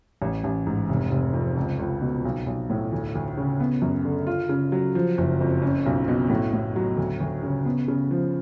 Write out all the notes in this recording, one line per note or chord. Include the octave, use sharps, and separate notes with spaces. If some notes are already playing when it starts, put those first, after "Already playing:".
A1
A1
G#2
F1
F1
F2
C#2
C#2
B2
B1
B1
A2
D2
D2
C#3
B3
F#2
D3
F4
C#3
F#3
F3
F#1
F2
C#4
B1
B2
A2
A2
F#3
D2
D2
C#3
B3
C#3
F3